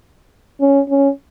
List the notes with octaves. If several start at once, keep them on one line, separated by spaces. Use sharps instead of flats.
C#4
C#4